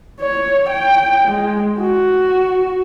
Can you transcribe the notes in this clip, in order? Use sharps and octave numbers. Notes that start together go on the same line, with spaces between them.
C#5
G5
G#3
F#4